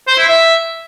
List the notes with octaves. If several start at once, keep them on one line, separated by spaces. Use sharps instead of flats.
C5
E4
E5